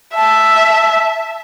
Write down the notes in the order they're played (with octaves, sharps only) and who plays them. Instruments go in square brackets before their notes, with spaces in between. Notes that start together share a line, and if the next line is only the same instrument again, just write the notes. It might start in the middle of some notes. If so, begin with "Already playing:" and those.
[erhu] E5 [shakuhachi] A5